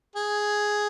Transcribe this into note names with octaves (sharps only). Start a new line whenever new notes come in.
G#4